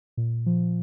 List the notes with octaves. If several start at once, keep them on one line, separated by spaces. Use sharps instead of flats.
A#2
F3